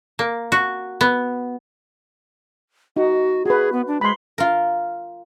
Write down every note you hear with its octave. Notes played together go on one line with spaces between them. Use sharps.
A#3
F#4
B3
D#4 F#4
F#4 G#4 B4
B3
D4
G#3 B5 C6
F4 A#4